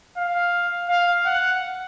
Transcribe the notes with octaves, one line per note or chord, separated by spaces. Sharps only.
F5
F5
F#5